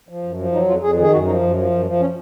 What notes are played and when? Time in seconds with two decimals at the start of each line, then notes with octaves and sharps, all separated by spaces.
0.09 F3
0.23 F#2
0.38 F3
0.52 F#3 D#4
0.68 F2 F4
0.82 F2 G#4
0.97 D#3 G#4
1.12 F#2 F#4
1.26 F3 D#4
1.41 F#2
1.56 F3
1.71 F#2
1.86 F3
2.01 C#4